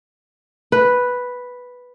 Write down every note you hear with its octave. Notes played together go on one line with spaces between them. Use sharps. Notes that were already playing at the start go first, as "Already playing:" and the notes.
B4